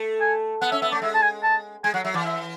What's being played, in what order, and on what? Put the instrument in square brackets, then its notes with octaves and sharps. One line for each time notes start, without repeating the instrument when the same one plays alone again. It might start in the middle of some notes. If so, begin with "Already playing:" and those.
Already playing: [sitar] A3
[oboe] G#5
[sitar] B3 [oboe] F#5
[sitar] C#4 [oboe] E5
[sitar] B3 [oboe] E5
[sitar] A3 [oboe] D5
[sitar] G#3 [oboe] E5
[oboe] A5
G#5
A5
[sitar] G#3 [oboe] G#5
[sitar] F#3 [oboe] F#5
[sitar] F#3 [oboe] E5
[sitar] E3 [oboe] D5
[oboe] E5